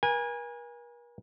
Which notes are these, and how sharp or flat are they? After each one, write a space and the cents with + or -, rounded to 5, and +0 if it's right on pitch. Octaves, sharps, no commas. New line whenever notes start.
A#4 +45 G#5 -20